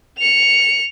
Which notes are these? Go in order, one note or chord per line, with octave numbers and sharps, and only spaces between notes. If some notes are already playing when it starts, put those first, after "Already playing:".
C#7 F7